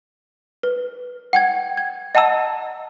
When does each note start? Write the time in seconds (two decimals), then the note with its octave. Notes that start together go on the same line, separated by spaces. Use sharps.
0.63 B4
1.33 F#5 G5 G#6
1.77 G#6
2.15 D#5 F#5 A5 A#5 E6